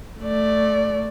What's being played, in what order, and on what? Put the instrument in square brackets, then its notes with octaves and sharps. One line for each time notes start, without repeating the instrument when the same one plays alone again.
[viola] A3 D5